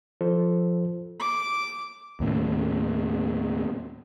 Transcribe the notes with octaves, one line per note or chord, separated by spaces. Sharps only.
F3 F4 A4 C5
D6
D#2 A2 C#3